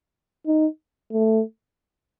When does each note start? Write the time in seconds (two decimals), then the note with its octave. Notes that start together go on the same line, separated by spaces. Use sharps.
0.47 D#4
1.12 A3